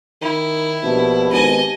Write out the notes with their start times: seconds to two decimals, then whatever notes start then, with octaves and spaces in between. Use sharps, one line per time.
0.21 D#3 E4
0.83 A#1 B2 G4 E5 A5
1.32 G#1 B3 D#5 G#5